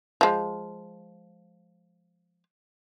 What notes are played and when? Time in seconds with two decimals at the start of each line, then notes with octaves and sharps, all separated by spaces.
0.21 F3 G#3